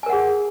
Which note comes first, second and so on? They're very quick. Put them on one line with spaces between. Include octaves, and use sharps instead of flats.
G#5 A#4 F#5 G#4